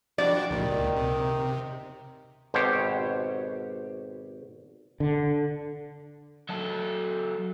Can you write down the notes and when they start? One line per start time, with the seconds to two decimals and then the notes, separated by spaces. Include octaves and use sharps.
0.18 F3 G3 D4 F#4 D5
0.50 C#2 A#2 D#3
0.96 C3
2.54 G#1 B2 G4 C5 C#5
5.00 D3
6.49 F#3 A4